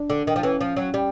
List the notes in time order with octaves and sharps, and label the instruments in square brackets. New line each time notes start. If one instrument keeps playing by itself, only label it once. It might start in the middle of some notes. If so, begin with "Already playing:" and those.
Already playing: [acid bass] D4
[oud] D3
D#3
F3
[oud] E3 [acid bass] C#4
[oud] F3
F#3
G3